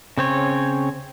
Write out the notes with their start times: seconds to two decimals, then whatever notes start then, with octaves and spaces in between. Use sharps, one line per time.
0.18 C#3 C4 C#5